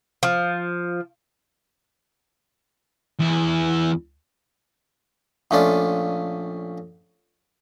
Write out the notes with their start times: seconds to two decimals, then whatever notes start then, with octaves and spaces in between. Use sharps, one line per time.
0.23 F3
3.20 E2 E4
5.51 A#1 A3 C#4 F4 D5